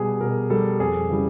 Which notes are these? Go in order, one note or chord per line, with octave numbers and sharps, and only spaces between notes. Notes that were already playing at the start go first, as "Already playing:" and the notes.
Already playing: B2 G3 G#4
B2 A#4
G3 A4
F2 G#4
C#3 E3 G3